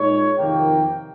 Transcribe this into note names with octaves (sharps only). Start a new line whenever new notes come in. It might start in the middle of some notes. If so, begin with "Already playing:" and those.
Already playing: A#2 G#3 D#4 C#5
F2 C3 D#3 A#3 G5